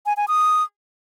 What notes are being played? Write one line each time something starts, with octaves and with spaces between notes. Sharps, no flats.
G#5
G#5
D#6